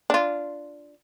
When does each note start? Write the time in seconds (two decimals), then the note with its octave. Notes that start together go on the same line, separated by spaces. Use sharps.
0.10 D4 F4